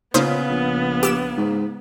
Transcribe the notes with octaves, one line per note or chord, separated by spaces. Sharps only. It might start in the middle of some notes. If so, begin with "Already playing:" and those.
A#2 C#3 A#3 B3 D#4 C5
A#1
G4 E6 E7
G#2